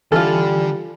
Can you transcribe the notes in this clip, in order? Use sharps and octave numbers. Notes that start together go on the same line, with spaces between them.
D3 E3 G3 F4 A4 G#5 F6